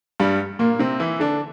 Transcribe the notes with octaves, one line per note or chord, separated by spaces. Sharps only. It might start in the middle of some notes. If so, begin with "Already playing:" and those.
G2 G3
A#2 A#3
C3 C4
E3 E4
D3 D4